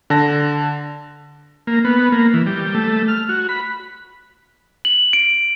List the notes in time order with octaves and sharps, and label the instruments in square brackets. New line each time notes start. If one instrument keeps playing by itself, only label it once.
[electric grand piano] D3 A5 A#6
[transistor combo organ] A#3
B3
A#3
E3
G3
A3
F6
F#4
B5
[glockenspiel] F#7
D7